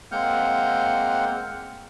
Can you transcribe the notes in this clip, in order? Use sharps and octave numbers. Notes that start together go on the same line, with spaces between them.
G#3 A#3 C4 F#5 F6 G6